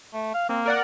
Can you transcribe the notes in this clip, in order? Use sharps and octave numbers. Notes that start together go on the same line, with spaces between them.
A3
F5
A#3 C4
A#4 D5 F#5